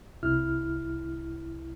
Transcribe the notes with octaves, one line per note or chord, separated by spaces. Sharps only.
C2 E4 F6